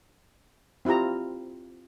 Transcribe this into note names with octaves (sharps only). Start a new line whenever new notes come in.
C4 E4 F4 G4 A#5